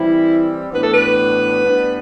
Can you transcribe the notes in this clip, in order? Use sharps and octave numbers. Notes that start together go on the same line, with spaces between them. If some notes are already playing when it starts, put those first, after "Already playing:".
Already playing: E3 G3 C4 E4
A2 E3 B3 D4 B4
A4
B4
A2 G3 B3 D4